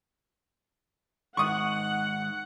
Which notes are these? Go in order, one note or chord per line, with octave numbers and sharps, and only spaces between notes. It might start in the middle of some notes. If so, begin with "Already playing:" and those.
G#2 D#3 F#5 C#6 D#6